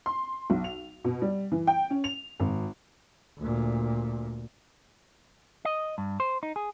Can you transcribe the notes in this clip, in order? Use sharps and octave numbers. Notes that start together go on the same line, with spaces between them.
C6
B1
F7
B2
G3
E3
G5
C#4
F7
G#1
D2 A#2
D#5
G2
C5
D#4
G#4